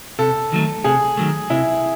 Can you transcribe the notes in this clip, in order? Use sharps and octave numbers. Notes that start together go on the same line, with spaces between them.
C3 A4
D#3 F#3 A3
C3 G#4
D#3 F#3 A3
C3 E4